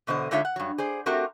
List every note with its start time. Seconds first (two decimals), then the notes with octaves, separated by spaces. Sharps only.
0.07 E2 B2 D3 C5 D#5
0.31 D3 G#3 D#4 F4 C#5 E5
0.45 F#5
0.56 G2 F#3
0.78 G#4 C5 D5
1.06 A3 C4 F#4 G4 A#4